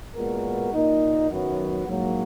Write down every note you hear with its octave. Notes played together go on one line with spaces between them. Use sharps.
A#2 G#3 B3 F#4 A#4
A#2 A#3 D#4
F#2 D#3 F#3 B3 F#4
A#1 G#2 F#3 A#3